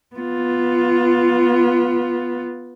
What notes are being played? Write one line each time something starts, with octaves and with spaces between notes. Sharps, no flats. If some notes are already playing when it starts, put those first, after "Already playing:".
B3 F4